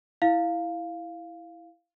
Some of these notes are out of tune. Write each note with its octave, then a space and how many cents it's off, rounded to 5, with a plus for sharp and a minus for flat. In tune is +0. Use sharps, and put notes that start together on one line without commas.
E4 +0 F5 +0